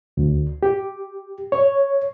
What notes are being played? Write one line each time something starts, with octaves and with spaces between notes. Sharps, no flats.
D2
G4
C#5